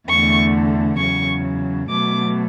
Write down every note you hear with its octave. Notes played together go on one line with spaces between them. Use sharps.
E2 D3 A3 C#6
E2 C#3 F#3 C#6
B2 F#3 A3 D6